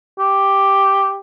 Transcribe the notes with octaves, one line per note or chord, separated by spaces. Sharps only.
G4